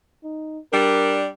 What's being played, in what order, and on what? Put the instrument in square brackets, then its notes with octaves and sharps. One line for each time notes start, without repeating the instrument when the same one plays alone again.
[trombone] D#4
[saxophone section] G3 D4 [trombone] A#4